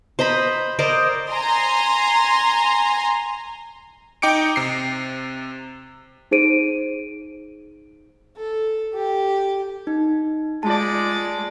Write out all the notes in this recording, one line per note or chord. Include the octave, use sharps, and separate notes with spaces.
C5 D#5 A#5 B5
A#4 C5 D5 D#5
G#5 A#5 C6
D#4 G5 D6 C#7 D7
C3 C7
D#4 G#4 C5 D7 D#7
A4
G4
D#4
G#3 F4 D5 A5